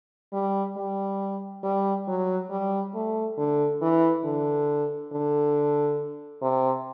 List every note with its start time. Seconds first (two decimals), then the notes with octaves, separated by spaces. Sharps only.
0.33 G3
0.77 G3
1.64 G3
2.08 F#3
2.50 G3
2.95 A3
3.38 D3
3.82 E3
4.24 D3
5.12 D3
6.42 C3